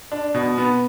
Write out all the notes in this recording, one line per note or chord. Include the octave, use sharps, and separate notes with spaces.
D4
B2
B3